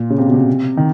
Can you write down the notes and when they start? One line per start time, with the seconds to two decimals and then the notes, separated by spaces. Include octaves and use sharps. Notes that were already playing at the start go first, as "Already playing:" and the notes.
Already playing: A#2
0.10 C#3
0.18 C3
0.27 B2
0.34 C3
0.77 D#3